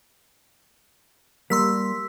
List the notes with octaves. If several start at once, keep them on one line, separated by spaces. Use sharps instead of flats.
G3 A#3 C6 E6 B6